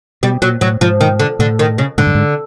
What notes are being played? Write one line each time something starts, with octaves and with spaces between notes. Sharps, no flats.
B2 G3
A#2 F#3
A2 F#3
G#2 F3
D#3
D3
A2 D3
D#3
C#3
G#2 D3
G2
G#2